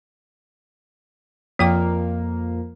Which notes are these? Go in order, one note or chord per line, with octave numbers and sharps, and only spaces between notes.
F2 F3 A#3 G5 D6